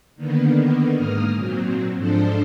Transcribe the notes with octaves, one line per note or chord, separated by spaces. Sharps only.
D3 D#3 A#3 B3
G#2 A#3 D#6 F6
A#2 F#3 C4
G#2 F3 D4 A4 C5